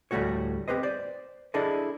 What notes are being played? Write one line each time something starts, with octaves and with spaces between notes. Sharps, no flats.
D2 A2 G3 A3 F#4 C#5
C4 G4 B4 C5 D#5
C5 D5
D4 E4 G#4 A4 D5 D#5